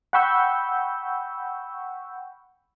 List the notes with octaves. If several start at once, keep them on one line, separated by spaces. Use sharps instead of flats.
F#5 G5 B5 C#6 E6 G6